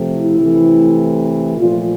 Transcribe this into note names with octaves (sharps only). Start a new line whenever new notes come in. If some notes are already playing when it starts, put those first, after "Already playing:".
Already playing: C3 F3 A3
E4
C3 E3 A3
A#2 F3 A3 F4